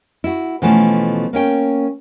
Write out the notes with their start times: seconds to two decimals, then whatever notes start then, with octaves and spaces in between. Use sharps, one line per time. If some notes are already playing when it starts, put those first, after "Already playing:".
0.24 E4 F#4
0.62 B2 E3 F3 A3 C#4
1.33 A#3 C#4 G5